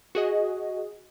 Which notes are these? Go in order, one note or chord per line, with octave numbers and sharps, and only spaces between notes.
F#4 G#4 D#5